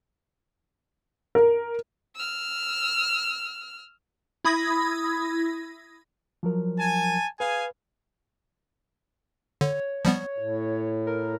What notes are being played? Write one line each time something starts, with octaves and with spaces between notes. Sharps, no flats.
A#4
E6 F6
E4 B5 D#6 G#6 A#6
F3 F#3 A#4
G#5 A5
G#4 B4 F5 G#5
D3 C#5
F3 G3 B3
A2
A#4